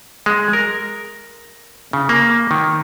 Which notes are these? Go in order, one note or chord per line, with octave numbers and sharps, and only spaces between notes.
G#3
A#4
C#3
A#3
D#3